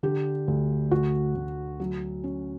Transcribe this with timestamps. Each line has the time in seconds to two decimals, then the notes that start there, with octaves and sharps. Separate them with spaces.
0.03 D3 G4
0.48 D2
0.91 D2 F#4
1.35 D2
1.80 F#3
2.24 C#4